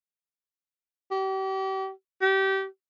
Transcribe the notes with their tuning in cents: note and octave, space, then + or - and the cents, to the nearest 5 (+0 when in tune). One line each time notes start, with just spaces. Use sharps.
G4 -35
G4 -25